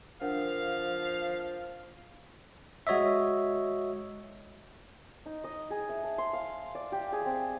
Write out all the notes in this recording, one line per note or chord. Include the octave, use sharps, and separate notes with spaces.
F3 D4 A#4 F5 F#5
G#3 F#4 C#5 D#5 E5
D#4
D#5
G#4
E5
A5
C6
F5
D5
G4
G#4
C4